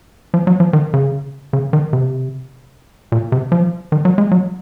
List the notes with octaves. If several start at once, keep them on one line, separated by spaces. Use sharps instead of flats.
F3
F#3
F3
D#3
C#3
C#3
D#3
C3
A#2
C3
F3
D#3
F#3
G#3
F#3